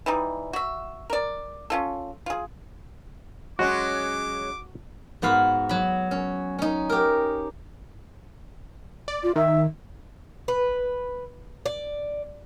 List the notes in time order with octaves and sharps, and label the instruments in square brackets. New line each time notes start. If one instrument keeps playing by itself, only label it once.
[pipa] E3 G3 D#4
F#4 E5
A#4 D5
C#4 F4 A4
F4 G#4
[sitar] F#3 G#3 C#4 [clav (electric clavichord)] F#4 [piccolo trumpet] D6
[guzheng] G#2 B3 F#4 F5 B5
F#3 B5
C#4
C#4 D#4
G4 A#4
[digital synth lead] D5
[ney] F4
[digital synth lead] D#3 [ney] E5
[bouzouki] B4
D5